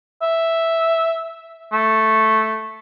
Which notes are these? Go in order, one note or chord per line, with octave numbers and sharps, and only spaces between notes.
E5
A3